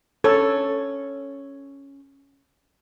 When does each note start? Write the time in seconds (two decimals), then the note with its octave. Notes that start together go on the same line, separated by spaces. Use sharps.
0.24 C#4 A4